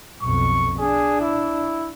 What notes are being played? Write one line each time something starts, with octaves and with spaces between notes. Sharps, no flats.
B1 F2 C#6
D4 G#4
E4